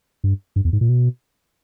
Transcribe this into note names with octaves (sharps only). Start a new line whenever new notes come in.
G2
G2
E2
G#2
A#2
B2